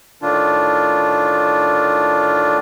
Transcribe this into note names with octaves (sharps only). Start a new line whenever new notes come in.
A2 D#3 D4 F4